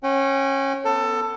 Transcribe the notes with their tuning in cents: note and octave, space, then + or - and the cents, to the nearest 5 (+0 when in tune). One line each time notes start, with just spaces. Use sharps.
C#4 -25 G5 -45
B3 +0 A4 +20